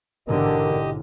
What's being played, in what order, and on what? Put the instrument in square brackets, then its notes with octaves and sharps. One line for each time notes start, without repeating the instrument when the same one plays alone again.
[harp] A1 G#2 B2 [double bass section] D3 [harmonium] G4 D#5 [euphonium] A#4